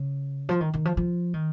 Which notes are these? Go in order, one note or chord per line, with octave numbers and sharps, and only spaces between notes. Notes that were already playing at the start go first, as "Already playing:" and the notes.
Already playing: C#3
F3
D#3
D#3
F3
F3
D#3